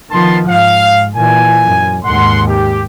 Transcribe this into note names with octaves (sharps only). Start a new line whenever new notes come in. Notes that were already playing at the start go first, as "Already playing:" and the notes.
D#3 F3 B3 A5 C6
G#2 F5
A#2 E3 G#5
F#2
D#2 G#2 F#5 C6
G4